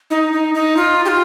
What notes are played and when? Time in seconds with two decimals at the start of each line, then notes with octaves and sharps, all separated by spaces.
0.10 D#4
0.33 D#4
0.54 D#4
0.77 F4
1.05 G4
1.08 F4